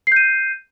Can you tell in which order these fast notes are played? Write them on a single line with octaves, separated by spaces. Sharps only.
C7 G6 D#7